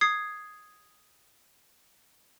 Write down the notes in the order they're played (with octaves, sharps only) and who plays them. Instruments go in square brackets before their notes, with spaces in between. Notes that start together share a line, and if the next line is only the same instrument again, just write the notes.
[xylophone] D#6 G#6 C7